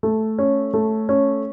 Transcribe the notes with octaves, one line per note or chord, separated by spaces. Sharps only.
A3
C#4
A3
C#4